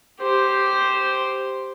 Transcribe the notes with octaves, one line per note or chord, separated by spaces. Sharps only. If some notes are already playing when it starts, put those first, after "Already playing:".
G4 C5